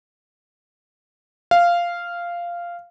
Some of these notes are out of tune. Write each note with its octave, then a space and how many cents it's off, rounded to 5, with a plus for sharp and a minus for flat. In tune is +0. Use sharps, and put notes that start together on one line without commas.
F5 -10